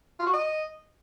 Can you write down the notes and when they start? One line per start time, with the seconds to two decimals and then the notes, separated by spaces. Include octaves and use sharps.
0.19 F4
0.26 F#4
0.33 D#5